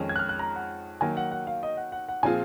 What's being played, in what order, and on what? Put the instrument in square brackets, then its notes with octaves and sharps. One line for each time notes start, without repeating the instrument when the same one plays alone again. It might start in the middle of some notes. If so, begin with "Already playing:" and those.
Already playing: [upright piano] F2 D#3 G#3 C#4 G#4
[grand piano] G#6
F#6
F6
F#6
A#5
F#5
[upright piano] D#3 F#3 A#3 [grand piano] G#5
[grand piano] F#5
F#5
F5
D#5
F#5
F#5
F#5
[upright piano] A#2 F3 C4 F4 G#4 [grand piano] G#5